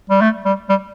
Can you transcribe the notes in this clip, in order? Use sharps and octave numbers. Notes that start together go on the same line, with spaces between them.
G3
A3
G3
G3